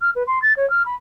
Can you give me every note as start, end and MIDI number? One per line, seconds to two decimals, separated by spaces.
0.01 0.10 89
0.15 0.23 71
0.27 0.39 84
0.42 0.53 93
0.57 0.69 73
0.70 0.83 89
0.86 0.95 83